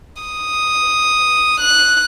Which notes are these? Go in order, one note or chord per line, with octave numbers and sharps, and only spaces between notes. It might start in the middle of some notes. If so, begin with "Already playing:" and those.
D#6
F#6